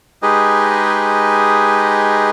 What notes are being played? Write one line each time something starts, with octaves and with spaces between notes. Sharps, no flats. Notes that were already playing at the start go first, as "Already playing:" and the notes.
G#3 D#4 G4 G#4 B4 D#5